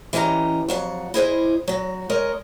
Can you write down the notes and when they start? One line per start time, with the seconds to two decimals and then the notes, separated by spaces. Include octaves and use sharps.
0.13 E3 C#4 G4 D#5 A#5
0.69 F2 F#3 F#5
1.14 E4 G#4 C5 D#5
1.68 F#3 F#4
2.10 G#3 A#4 C#5 D#5